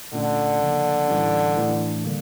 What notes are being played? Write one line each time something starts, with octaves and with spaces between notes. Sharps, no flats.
A#2 D3 A3 C#4 F4
C#3 F3 A#3
A2 E3 G3 C#4
A2 E3 A3 D4
D3 G3 A#3